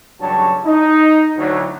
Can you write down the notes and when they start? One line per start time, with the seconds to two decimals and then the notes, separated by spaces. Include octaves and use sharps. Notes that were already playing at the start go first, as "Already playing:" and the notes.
0.21 A1 G2 C#3 F#3 C#5 A5
0.66 D#4
1.37 D2 A2 F#3